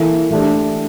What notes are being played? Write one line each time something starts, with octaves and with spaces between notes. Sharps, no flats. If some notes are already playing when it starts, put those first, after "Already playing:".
Already playing: E3 A#3 E4 A4
E3 A3 D4 G4